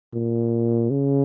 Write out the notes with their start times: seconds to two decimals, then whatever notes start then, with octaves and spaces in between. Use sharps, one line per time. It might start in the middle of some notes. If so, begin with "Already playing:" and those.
0.13 A#2
0.90 C#3